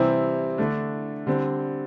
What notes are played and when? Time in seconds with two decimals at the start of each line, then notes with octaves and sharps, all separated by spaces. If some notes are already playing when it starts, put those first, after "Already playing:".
Already playing: C3 E3 G3 C4 E4
0.58 D3 A3 D4
1.27 D3 G3 C4